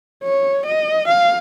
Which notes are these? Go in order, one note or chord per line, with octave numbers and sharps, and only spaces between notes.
C#5
D#5
F5